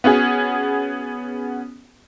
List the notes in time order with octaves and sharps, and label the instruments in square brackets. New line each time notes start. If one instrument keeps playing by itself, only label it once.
[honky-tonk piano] B3 C#4 F#4 G#4